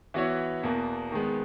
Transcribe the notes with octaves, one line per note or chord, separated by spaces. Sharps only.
E3 B3 F#4 C#5 E5
E2 B2 A#3
D#3 G#3 B3